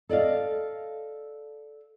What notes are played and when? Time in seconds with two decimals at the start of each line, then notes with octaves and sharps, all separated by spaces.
0.09 A4 D5 D#5 F5